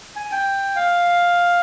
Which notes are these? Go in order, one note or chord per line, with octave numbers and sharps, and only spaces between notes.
G#5
G5
F5